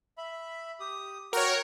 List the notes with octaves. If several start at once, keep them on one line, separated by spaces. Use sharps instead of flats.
E5 B5
G4 D#6
F#4 A#4 C#5 F#5 G5